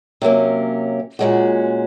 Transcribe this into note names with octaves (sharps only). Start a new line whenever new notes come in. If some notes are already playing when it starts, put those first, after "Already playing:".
C3 F#3 A#3 C#4
A#2 G#3 C#4 F#4